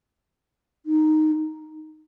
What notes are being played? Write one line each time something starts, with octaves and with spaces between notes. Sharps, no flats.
D#4